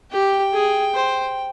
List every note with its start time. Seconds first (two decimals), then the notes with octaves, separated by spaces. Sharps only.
0.12 G4 G5
0.53 G#4
0.94 C5